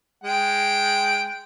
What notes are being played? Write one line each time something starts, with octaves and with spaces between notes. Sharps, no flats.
G#3 G5